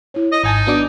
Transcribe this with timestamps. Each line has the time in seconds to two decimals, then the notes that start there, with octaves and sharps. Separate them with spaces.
0.14 E4 C#5
0.32 D#5
0.44 G#1 D#4 G#5 A5
0.67 B3 D4 F#4 D6